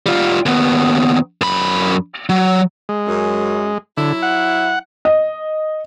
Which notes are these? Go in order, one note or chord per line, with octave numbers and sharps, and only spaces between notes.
G3 F4
D#2 B3
F#2 B5
F#3
G#3
F#2
D3 F#3 E4
F#5
D#5